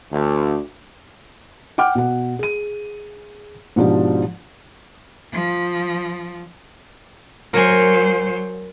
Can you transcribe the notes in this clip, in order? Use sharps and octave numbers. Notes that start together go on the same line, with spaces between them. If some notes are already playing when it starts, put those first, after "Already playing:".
D2
F#5 G5 D6 F6
B2 F#5
G#4 D#7
G#2 B2 F3 D4 G4
F3
F#3 A#4 C5 G#5